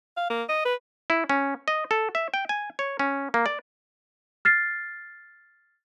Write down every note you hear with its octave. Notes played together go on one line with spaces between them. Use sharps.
F5
A#3
D#5
B4
E4
C#4
D#5
A4
E5
G5
G#5
C#5
C#4
A#3
D5
F6 A6 C7